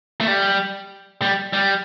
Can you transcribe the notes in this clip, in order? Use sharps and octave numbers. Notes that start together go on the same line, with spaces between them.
A3
G3
G3
G3